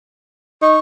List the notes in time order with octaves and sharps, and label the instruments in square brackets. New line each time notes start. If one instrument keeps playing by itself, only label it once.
[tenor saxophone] D#4 [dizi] C#6